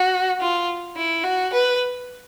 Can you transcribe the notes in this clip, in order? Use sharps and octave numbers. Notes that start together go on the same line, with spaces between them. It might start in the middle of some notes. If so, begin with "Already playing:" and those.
Already playing: F#4
F4
E4
F#4
B4